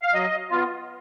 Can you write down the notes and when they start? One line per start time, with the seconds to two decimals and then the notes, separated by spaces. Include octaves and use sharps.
0.02 F5
0.13 F#3 D#5
0.51 B3 F4